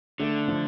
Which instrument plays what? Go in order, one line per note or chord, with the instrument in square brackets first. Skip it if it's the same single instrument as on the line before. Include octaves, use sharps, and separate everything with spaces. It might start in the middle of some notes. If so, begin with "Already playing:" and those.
[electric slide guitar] D3 [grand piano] A3
[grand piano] F3